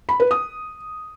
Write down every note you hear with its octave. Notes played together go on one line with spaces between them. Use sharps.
B5
B4
D#6